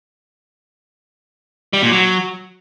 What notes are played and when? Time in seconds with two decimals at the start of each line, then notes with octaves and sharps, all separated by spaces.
1.73 G3
1.82 A#2
1.92 F#3